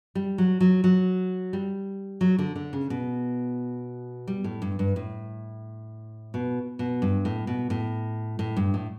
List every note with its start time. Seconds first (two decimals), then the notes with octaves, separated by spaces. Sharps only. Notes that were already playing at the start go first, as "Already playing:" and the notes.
0.15 G3
0.38 F#3
0.60 F#3
0.84 F#3
1.53 G3
2.21 F#3
2.39 D3
2.56 D3
2.73 C#3
2.90 B2
4.28 G3
4.44 A2
4.62 G2
4.79 G2
4.96 A2
6.34 B2
6.79 B2
7.02 G2
7.25 A2
7.47 B2
7.70 A2
8.39 A2
8.57 G2
8.74 A2